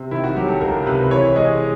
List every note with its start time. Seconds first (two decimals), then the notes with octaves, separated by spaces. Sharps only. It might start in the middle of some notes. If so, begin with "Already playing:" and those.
Already playing: C3
0.11 D#3 E4
0.24 F#4
0.37 F#3 G4
0.48 A4
0.61 C#2 A#4
0.86 C3 B4
1.11 E3 C#5
1.36 G#3 D#5